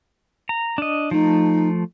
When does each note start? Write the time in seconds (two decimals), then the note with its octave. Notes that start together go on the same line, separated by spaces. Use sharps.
0.49 A#5
0.78 D4 D#5
1.11 F3 A3 D#4